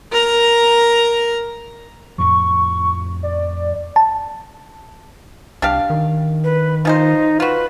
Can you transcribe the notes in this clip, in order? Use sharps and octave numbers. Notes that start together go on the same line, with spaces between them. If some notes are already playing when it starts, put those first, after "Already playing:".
A#4 A#5
F2 A2 F3 C#6
D5
A5
C2 D4 G4 F5
D#3
B4
F3 D#4 G#4 C5
F4 F#4 B4